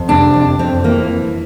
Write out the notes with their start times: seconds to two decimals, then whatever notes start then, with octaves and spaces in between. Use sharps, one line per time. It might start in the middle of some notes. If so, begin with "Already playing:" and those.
Already playing: F2
0.08 C3 D4
0.34 F2
0.59 F2 C4
0.84 E3 A#3